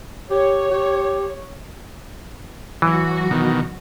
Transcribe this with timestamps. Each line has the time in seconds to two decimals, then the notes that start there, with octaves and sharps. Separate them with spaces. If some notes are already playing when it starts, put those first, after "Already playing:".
0.31 G4 C#5
0.71 G4
2.82 E3 F#3 F#4
3.31 B2 D#3